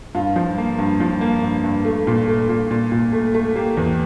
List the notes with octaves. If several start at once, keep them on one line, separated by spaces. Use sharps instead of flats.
G2 F4
F3
A#3
G2
F3
A#3
G2
G2
A3
A#2
A3
A#2
A#2
A#2
A3
A3
A#3 G4
E2